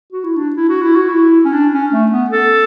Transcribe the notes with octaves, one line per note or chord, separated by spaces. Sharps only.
F#4
E4
D4
E4
F#4
E4
F#4
E4
C#4
D4
C#4
A3
B3
A4